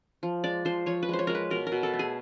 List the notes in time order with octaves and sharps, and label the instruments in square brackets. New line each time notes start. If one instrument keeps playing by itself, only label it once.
[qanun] F3
G#3 D5
F3 C5
F3 C#5
B4
G#3 C5
C#5
G#3 A#4
B4
B2 A#4
A#4
B2
A4
A3
G#4